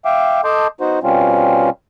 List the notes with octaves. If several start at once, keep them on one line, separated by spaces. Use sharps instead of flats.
E5 F5 G5 D6
A4 D#5 A5 C6 D6 G6
B3 D#4 F#4 C5
B2 G3 C4 C#4 F4